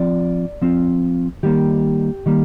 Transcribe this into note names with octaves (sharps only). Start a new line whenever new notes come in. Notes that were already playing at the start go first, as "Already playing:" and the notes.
Already playing: F3 C4 F4 D5
F3 C4 F4
D#3 G3 A#3 G4
D#3 G3 A#3